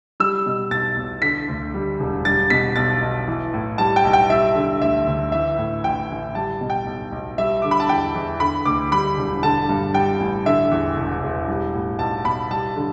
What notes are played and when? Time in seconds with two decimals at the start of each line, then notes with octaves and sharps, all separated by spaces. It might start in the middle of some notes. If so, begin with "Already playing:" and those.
0.20 G3 E6
0.46 B2
0.71 B1 A6
0.97 B1
1.22 D3 B6
1.48 D2
1.74 G3
2.00 E1
2.25 G3 A6
2.50 B2 B6
2.76 B1 A6
3.02 B1
3.28 E3
3.54 A2
3.78 G3 A5
3.96 G5
4.05 B1
4.13 G5
4.30 G3 E5
4.55 D3
4.81 D2 E5
5.07 D2
5.32 E3 E5
5.58 A2
5.84 A1 G5
6.10 A1
6.35 G3 A5
6.61 B2
6.70 G5
6.86 B1
7.12 B1
7.38 G3 E5
7.62 D3 D6
7.71 B5
7.80 A5
7.89 E2 G5
8.14 E2
8.40 D3 B5
8.65 D2 D6
8.92 G3 B5
9.17 E1
9.43 D3 A5
9.69 G2
9.94 G3 G5
10.19 A1
10.46 D3 E5
10.71 E2
10.97 E1
11.22 E1
11.48 G3
11.74 A2
11.99 B1 A5
12.25 B1 B5
12.50 G3 A5
12.76 D3